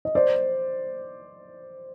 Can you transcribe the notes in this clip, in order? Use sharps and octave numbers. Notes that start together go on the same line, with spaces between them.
D#5
C5 D5